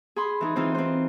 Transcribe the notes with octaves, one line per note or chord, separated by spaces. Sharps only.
G#4 B5 C6
E3 D#4 G#4
E3 C4 D#4 F4 C5
C4 C5